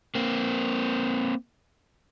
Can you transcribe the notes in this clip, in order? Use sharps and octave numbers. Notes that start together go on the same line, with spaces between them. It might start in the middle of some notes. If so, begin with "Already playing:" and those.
A#3 C4